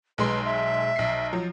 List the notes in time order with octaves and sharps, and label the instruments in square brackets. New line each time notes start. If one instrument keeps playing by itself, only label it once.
[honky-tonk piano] B1 G#3 C6 [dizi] B4
[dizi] E5
[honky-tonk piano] B1 C7
F3 F#3